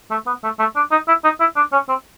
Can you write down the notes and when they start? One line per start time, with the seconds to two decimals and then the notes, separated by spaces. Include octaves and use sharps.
0.11 A3
0.27 B3
0.43 A3
0.59 A3
0.76 D4
0.91 D#4
1.08 E4
1.24 D#4
1.40 E4
1.56 D4
1.72 C#4
1.88 C4